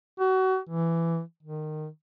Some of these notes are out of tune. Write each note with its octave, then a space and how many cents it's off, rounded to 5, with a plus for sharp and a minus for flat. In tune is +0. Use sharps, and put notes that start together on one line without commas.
F#4 +30
E3 +15
D#3 -20